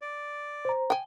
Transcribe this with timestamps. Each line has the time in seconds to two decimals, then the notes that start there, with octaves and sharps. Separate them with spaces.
0.01 D5
0.65 C5 A#5
0.90 G5 G#5